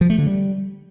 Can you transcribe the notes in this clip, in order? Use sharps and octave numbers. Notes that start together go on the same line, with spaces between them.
F3
A3
D3
G3